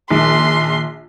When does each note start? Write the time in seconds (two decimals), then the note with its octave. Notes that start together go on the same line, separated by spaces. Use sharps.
0.10 A#1 D#3 C6